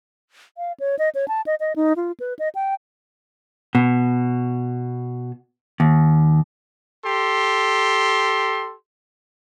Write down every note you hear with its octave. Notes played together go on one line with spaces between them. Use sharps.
F5
C#5
D#5
C#5
A5
D#5
D#5
D#4
F4
B4
D#5
G5
B2
D#2
G4 A4 C6